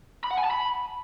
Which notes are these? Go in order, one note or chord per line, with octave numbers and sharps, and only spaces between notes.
B5
F#5
G#5
A5
B5